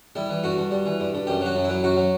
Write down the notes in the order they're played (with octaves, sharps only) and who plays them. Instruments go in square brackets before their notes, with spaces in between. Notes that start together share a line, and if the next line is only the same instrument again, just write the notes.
[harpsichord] G3 E4
E3
G2 F#4
G2
G3
E3
G2
G2
F#2 G4
F#3 F#4
F#2
E4
F#3
F#2 F#4
F#3